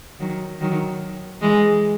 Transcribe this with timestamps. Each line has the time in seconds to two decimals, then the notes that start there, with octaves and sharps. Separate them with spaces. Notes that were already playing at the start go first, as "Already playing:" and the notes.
0.20 D#3 F#3
0.61 D#3 F#3
1.42 E3 G#3